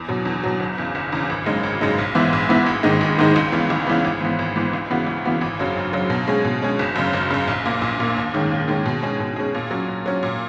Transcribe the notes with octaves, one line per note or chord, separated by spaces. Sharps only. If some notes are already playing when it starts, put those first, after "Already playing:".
Already playing: E2
B2 F#3
E2
B2 F#3
F#1
E2 C#3
F#1
E2 C#3
G#1
F#2 C#3 G#3 D#4
G#1
F#2 C#3 G#3 D#4
A#1
G#2 E3 B3 E4
A#1
G#2 E3 B3 E4
G#1
G#2 D#3 G#3 D#4
G#1
G#2 D#3 G#3 D#4
C#2
C#3 E3 B3
C#2
C#3 E3 B3
G#1
G#2 E3 B3
G#1
G#2 E3 B3
C#2
C#3 E3 B3 F#4
C#2
C#3 E3 B3 F#4
G#1
F#2 C#3 F#3
G#1
F#2 C#3 F#3
B2
G#3 C#4 G#4
B2
G#3 C#4 G#4
F#1
F#2 C#3
F#1
F#2 C#3
A#1
A#2 A#3
A#1
A#2 A#3
D#2
D#3 G#3 C#4
D#2
D#3 G#3 C#4
B2
G#3 C#4 G#4
B2
G#3 C#4 G#4
A#2
F#3 C#4
A#2
F#3 C#4
A#2